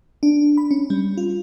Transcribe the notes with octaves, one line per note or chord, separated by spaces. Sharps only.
D4
B5
C#4
G3
F4